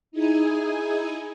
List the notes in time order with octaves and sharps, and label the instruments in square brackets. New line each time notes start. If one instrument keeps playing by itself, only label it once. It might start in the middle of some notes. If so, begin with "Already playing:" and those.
[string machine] D#4 E4 G#4 G#5